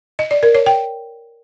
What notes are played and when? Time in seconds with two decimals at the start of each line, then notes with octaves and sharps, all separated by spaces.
0.19 D#5
0.31 D5
0.43 A#4
0.55 C#5
0.66 G5